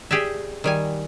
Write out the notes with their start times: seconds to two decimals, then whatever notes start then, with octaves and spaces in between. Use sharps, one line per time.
0.11 G4 G#4 D5 E5
0.64 D#3 G3 G#5